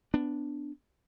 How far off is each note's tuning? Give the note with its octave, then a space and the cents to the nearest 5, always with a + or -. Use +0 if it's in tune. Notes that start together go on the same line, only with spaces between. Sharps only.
B3 +20 D4 +0